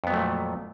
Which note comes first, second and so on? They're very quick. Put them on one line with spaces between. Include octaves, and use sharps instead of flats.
F2 B3 F#3 A3 A#2